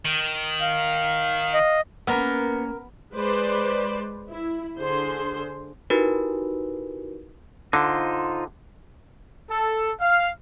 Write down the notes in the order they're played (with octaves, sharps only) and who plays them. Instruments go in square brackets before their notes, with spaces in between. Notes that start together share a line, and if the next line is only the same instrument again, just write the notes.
[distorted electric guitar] D#3
[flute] F5
[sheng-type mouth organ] D#5
[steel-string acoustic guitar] A#3 C#4 [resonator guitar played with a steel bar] B3 [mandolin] A#4 F6
[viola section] G#3 B4 C5 D5
E4
D3 G#4 C5 C6
[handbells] D#4 E4 F#4 G4 A#4 B4
[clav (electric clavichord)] D3 [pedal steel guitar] D#4 F4 C5
[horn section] A4
F5